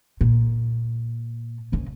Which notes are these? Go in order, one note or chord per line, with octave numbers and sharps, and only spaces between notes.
A#2
F#1 C#3